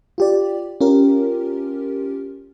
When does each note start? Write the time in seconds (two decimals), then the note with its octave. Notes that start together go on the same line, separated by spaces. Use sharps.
0.18 F4 G4 D5
0.81 C#4 F4 G4 A#4